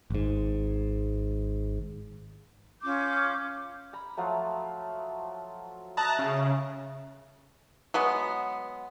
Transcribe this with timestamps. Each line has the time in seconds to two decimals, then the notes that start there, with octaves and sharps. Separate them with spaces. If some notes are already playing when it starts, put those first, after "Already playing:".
0.10 G#1 G#2
2.83 C#4 F4 D6 G6
3.93 A#5 B5
4.17 F3 F#3 A3
5.97 D#5 E5 A5 A#5 F#6
6.19 C#3
7.94 F#3 G#3 B3